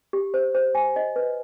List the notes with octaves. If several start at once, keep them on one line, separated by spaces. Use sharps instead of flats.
G4
C5
C5
G#5
D#5
B4